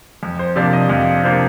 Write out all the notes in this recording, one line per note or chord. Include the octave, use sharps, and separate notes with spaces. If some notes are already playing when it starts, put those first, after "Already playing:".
F2
C5
C3 F3 A#3 D4 D5
D#5
F2 F5
C3 F3 A#3 D4